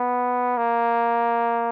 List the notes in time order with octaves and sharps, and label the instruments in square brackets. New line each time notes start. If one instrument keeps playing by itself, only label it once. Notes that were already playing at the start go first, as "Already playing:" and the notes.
Already playing: [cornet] B3
A#3